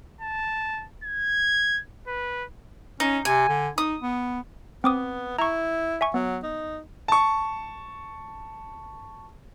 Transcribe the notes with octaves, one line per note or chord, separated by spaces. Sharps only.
A5
G#6
B4
C#4 D#4
C3 G#5
D3
D#4 D#6
B3
B3 C4 D6 D#6
E4 A#5 C#6
E5 G#5 C#6
F#3 B3
D#4
A5 C#6